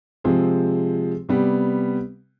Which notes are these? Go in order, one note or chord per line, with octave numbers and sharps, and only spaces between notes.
C3 F3 G#3 C4 G#4
C3 G3 B3